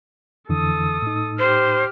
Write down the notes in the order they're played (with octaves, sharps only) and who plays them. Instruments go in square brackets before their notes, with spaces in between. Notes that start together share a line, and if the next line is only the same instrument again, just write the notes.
[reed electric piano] F2 D3 E3 [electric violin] A4 D#6
[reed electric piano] A2 D#4
[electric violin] G4 F6 [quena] C5